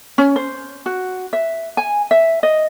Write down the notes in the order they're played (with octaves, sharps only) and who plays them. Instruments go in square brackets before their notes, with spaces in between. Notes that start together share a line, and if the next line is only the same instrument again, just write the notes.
[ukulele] C#4
C5
F#4
E5
G#5
E5
D#5